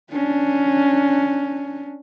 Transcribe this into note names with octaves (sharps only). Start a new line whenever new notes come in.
C#4 D4